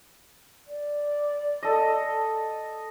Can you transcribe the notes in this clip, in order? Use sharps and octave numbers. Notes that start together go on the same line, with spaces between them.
D5
A4 D#5